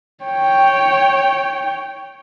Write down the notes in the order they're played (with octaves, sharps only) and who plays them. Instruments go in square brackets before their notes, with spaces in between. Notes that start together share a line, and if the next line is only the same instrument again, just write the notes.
[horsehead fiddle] C#5 G5